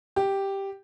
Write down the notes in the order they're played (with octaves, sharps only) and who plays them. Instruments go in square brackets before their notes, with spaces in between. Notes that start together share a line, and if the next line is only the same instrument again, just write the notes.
[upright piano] G4